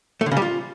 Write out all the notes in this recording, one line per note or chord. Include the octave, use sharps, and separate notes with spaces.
A3
D3
C#3
G3
F4